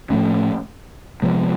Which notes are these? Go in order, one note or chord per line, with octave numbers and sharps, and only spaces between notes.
A2 F3 A3 C#4
C3 F3 G#3 B3